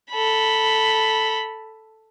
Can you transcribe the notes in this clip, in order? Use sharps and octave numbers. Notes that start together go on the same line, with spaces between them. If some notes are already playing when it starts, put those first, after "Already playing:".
A4 B5